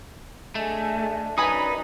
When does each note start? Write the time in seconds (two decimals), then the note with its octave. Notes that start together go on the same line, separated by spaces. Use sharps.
0.55 A3 D4 G#4 D#5 G#5
1.38 F#2 D#4 B4 D5 G#5 B5 D#6